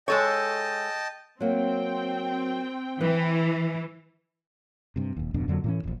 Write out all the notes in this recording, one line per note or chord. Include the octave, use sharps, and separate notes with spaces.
G#3 A4 C#5 D#5 G5 A5
F#3 A#3 C4 G5
E3 B4
G2 C3
D#1 D#2
D1 F2 B2 D4
F2 D3 F#3 A#3
A2 E3 C#4
D#1 A#1